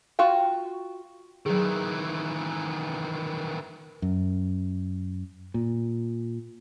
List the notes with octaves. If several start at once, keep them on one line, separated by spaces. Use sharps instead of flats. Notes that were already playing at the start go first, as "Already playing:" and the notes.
F4 F#4 F5 G5
D#3 E3 F#3 G#4
F#2
A#2